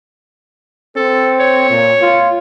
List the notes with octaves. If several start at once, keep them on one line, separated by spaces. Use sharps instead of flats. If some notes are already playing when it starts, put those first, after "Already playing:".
C4 A4
C#5
A#2
F4